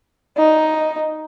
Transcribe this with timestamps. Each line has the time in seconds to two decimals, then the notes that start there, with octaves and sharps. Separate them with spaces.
0.37 D#4